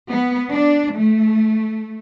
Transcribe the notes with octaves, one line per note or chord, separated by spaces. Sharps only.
B3
D4
A3